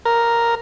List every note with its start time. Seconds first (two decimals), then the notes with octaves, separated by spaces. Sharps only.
0.05 A#4